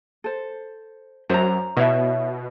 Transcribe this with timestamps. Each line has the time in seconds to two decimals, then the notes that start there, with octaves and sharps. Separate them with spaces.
0.24 A4 C5
1.29 F#2 C5 A#5
1.77 B2 E4 C#5 E5